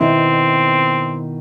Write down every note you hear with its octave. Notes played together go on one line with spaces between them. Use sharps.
B2 D#3 C4 E4